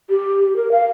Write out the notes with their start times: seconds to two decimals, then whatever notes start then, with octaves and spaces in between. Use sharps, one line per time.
0.10 G4
0.56 A#4
0.71 F5